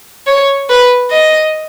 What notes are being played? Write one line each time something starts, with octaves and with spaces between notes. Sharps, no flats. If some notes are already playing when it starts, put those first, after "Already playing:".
C#5
B4
D#5